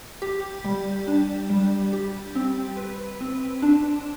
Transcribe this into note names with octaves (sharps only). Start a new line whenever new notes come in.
G4
G3
D4
G3
G4
C4
B4
C4
D4